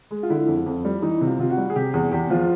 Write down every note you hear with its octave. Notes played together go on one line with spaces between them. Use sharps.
G#3
F4
D3 E4
F2
F2
G3
E3 D#4
C3
F4
C3 F4
F#4
G3
G#4
C3 G4
E2 G#4
E2 G4
F3 F4